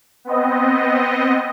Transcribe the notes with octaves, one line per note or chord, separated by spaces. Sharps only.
B3 C4 D#5